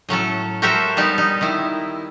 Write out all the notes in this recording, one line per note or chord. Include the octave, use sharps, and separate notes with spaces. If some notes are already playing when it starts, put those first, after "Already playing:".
A2 F#3 C#4 A4
F#4 G4 A4 A#4 C5 E5
G3 B3 D#4 G4
D#4
D#3 E4